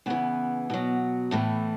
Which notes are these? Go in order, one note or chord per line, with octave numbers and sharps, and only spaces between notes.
C#3 E3 B3
B2 F#3
A2 E3 A3